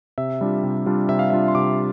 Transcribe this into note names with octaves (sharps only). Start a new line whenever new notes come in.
C3 E5
G3 D4 F4
C3
G3 D4 F4
C3 E5
F5
G3 D4 F4 E5
C6
C3 D6